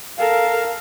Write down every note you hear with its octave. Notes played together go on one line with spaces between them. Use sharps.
A4 A#4 F5